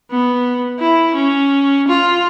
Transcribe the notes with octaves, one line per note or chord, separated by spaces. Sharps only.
B3
E4
C#4
F4